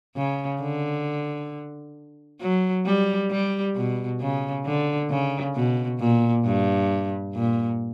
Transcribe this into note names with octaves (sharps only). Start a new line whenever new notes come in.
C#3
D3
F#3
G3
G3
B2
C#3
D3
C#3
B2
A#2
G2
A#2